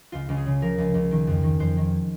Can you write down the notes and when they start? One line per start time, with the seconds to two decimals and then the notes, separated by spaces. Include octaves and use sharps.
0.12 C#2 F4
0.29 C#2
0.37 G#4
0.46 C#3
0.62 F3 A#4
0.78 C#2
0.94 C#2
1.11 D#3
1.27 F2
1.43 D#3
1.60 F2 C5
1.77 D#3